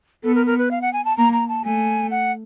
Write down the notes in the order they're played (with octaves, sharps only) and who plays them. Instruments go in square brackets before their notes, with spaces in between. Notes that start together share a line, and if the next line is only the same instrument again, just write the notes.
[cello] B3 [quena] A4
[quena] A#4
A#4
B4
F5
F#5
G#5
A5
[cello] A#3 [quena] A#5
[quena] A#5
A5
[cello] A3 [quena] G#5
[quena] F#5